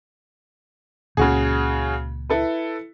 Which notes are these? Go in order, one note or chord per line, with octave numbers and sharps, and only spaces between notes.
C#2 A#2 C#3 F#4 G#4
E4 A4 B4